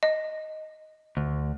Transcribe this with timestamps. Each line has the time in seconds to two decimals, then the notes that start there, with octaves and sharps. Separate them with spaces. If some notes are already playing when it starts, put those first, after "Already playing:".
0.03 D#5
1.17 D2